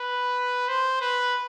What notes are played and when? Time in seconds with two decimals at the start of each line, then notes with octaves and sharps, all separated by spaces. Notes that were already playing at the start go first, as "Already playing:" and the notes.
Already playing: B4
0.68 C5
1.01 B4